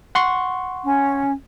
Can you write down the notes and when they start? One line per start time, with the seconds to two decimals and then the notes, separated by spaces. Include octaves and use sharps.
0.15 F#5 C6 C#6
0.85 C#4